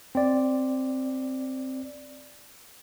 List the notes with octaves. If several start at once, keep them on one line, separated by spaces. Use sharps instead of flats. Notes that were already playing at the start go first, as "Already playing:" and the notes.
C4 D5